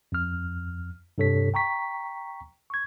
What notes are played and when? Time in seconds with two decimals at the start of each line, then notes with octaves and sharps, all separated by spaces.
0.12 F2 F6
1.18 G2 C3 A4 C#5 B6
1.54 G5 A#5 C#6 B6
2.70 C#6 G#6